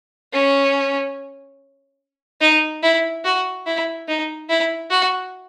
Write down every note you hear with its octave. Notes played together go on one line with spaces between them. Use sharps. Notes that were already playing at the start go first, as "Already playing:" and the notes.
C#4
D#4
E4
F#4
E4
D#4
E4
F#4